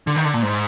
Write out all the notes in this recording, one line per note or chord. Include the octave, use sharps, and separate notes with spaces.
D3
D#3
D3
A#2
G#2